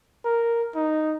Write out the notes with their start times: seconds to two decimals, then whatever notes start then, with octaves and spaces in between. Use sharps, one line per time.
0.25 A#4
0.76 D#4